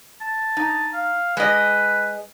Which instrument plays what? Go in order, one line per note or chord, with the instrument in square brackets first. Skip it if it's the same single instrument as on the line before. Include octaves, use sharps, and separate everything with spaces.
[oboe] A5
[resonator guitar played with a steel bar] D#4
[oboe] F5
[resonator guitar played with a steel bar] G#3 D#5 [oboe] B4